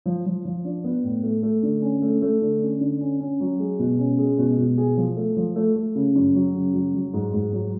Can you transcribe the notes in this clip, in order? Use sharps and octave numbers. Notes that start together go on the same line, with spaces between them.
F3
F3
F3
D4
B3
A2
A3
A3
D3
C#4
A3
A3
D3
C#4
D3
C#4
C#4
F#3
G#3
B2
C#4
G#3
B2
B2
G#4
F3
A3
F3
A3
A3
C#3
F#2
F#3
C#3
F#3
F#3
G#2
G#2
F#3